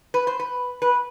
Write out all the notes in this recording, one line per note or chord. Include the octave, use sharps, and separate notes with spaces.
B4
C5
B4
B4